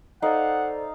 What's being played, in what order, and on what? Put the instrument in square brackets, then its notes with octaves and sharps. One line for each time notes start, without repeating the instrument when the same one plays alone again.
[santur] D#4 F5 [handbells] A4 C5 D5 [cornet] F#5